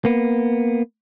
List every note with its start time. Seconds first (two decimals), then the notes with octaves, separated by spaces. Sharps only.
0.05 A#3 B3